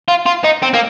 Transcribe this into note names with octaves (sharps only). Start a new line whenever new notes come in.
F4
F4
D#4
C4
A#3